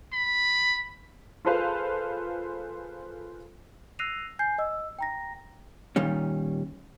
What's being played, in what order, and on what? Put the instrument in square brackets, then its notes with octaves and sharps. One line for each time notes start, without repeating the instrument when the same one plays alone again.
[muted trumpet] B5
[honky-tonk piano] F4 G#4 A4 B4 C5 F5
[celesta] E6 F#6 A#6 C7 D#7 F7
G#5 G6 C7
D#5 E6
G5 A#5 A#6
[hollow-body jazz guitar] A#2 D#3 G3 C#4